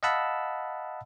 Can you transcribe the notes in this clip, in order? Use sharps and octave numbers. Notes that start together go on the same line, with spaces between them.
D#5 F5 F#5 A5 B5 E6